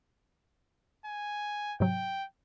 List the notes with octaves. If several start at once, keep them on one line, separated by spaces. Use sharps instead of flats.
G#5
G#2 C3 F#3 G5